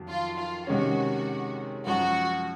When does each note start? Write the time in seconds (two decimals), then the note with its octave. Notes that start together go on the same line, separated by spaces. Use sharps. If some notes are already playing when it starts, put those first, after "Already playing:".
Already playing: F2 D#3 F#3
0.08 F4
0.38 F4
0.67 C3 D#3 G#3 C#4 F#4
1.86 F#2 F3 G#3 F#4